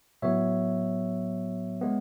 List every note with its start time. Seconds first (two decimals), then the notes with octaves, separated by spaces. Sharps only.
0.22 A2 F#3 B3 C#5 E5
1.81 G#3 B3